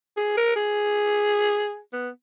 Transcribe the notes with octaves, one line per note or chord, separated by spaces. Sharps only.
G#4
A#4
G#4
B3